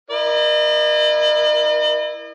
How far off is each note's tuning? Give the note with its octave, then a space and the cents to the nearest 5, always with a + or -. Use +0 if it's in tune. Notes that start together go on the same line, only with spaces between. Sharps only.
E4 -5 A#4 +25 D#5 -45